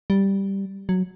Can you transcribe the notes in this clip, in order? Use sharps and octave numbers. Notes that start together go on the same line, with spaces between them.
G3
F#3